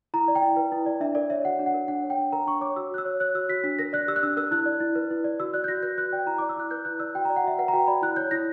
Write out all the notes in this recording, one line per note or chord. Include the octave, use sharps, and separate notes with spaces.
E4 A#5
D5
G5
E4
B4
E4
D5
D4 E5
A#4 D5
C#5 E5
F#4 F#5
D4
F#5
A#4
D4 F#5
C#5
G5
D4
A#4 A#5
D4 C#6
C#5 D6
F#4 E6
F#4 F#6
E6
C#5
C#5 F#6
F#4 E6
F#4 B6
D4 B6
A#4 A#6
D5 F#6
G4 E6
F#6
D4 E6
A#4 E6
E4 F#6
D5
E4
B4
E4
D5
F#4 E6
D5 F#6
G6
F#4 A#6
B4 G6
F#4 F#6
D5 G5
E4 A#5
D6
D5
E6
E4 F#6
B4 G6
E4 F#6
D5 E6
F#4 G5
A#5
D5
F#5
F#4 E5
B4 F#5
A#5
F#4 G5
D5 B5
E4 F#6
C#5 G6
E4 A#6